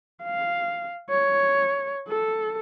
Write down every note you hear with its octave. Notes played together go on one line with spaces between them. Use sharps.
F5
C#5
A4